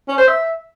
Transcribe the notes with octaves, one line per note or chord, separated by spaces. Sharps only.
C#4
C5
E5